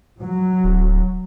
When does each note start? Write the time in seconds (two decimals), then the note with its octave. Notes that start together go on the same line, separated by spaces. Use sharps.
0.21 F#3
0.64 D1